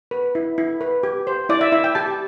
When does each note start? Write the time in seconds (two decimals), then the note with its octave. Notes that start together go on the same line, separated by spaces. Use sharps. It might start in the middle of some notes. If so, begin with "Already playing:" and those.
0.11 B4
0.35 E4
0.58 E4
0.81 B4
1.03 G4
1.27 C5
1.49 E4 D5
1.61 E5
1.72 E4 E5
1.84 G5
1.95 G4 A5